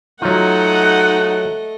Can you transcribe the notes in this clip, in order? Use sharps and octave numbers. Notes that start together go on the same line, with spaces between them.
F#3 A3 D#4 F4 D#5 F#5